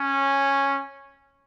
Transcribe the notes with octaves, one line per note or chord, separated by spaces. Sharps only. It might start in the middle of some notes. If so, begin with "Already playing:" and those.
Already playing: C#4